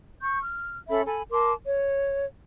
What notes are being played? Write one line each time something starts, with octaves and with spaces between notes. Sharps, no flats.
C#6 G6
F6
C#4 A4 E5 B5
A4 G#5 B5
A#4 A5 C6 D6
C#5